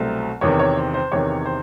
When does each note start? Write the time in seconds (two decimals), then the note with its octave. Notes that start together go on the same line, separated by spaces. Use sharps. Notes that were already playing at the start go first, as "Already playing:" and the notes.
Already playing: C2 B2 F#3 A3 C4
0.41 E2 C3 D#3 C#5
0.59 C#5
0.77 C5
0.94 C5
1.12 E2 C3 D#3 C#5
1.46 C5